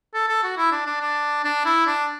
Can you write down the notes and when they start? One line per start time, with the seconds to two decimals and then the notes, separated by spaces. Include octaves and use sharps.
0.14 A4
0.28 A4
0.44 F#4
0.57 E4
0.72 D4
0.86 D4
1.01 D4
1.44 D4
1.65 E4
1.87 D4